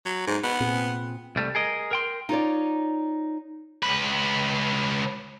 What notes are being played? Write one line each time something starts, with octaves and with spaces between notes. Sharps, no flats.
F#3
G#2
B3
A#2 C4 G#4
C2 G3 A3
G#4 A#4 D#5
A#4 G5 C6
D#4 F4 C#5 D5
C#2 B4